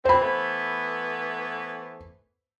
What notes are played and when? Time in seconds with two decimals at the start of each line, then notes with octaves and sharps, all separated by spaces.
0.05 E3 C4 C5 B5
0.22 E3 A3 B3